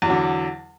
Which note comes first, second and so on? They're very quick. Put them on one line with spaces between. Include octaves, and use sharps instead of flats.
E2 F#3 D3